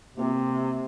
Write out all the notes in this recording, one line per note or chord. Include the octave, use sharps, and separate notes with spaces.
C3 A#3 C4 G4